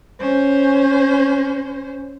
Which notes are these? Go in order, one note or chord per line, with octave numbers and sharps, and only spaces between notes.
C#4 C5